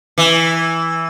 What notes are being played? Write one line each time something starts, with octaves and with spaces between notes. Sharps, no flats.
E3